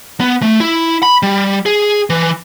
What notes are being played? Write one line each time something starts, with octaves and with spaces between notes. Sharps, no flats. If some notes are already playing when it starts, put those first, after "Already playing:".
B3
A3
E4
B5
G3
G#4
E3